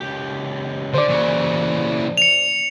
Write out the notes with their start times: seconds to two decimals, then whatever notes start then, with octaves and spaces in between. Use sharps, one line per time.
0.01 C#2 G4
0.94 D3 C5 D5
1.09 A#2 C#3 E3 C#5
2.17 C#7 F7